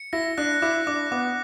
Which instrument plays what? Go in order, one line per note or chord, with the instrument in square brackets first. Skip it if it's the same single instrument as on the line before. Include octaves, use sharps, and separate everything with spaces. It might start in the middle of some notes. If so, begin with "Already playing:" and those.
Already playing: [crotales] C#7
[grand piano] E4 [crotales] A#6
[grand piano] D4 [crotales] F#6
[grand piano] E4 [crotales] D6
[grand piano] D4 [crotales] D6
[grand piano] B3 [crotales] D6